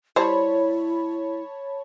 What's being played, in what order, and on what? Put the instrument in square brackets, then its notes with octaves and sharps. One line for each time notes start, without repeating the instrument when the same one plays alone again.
[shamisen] G3 C5 [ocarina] E4 [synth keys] C#5 A5 B5